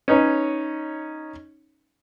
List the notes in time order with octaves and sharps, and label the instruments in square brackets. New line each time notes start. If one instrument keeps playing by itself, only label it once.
[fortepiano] C#4 D#4 B4 C#5